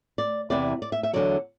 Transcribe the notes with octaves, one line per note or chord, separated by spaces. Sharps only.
D5
E2 C3 E3 D5
D5
E5
E5
E2 D3 F#3 D5